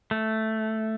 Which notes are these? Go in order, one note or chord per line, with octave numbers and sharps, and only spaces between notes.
A3